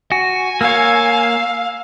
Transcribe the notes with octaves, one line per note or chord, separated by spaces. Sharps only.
F#4 G#5
A#3 C#5 F5 E6